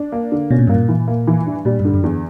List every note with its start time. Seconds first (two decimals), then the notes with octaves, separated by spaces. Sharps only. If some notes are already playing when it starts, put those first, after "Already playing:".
Already playing: D4
0.12 A#3
0.32 D3
0.51 B2 C#4
0.59 A#2
0.67 G2 A#3
0.75 A#2
0.89 E3
1.08 A#3
1.27 E3
1.46 G2
1.65 A#2 G3
1.80 G2
1.85 D3
1.94 F#2
2.04 E2